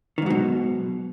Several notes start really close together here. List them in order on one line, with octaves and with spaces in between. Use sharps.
D#3 G#2 F#3 B2